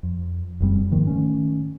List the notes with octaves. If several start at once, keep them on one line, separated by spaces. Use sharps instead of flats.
F2
F1 F#2 G3 C4
G#2 D#3 F3 A#3
D#3 A3 C#4